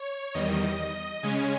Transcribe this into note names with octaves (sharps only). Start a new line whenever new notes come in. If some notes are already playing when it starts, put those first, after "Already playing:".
Already playing: C#5
E2 D#3 G3 D#5
C#3 G#3 C#4 G#5